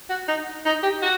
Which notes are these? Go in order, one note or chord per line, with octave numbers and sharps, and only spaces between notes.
F#4
D#4
D#4
G4
F#4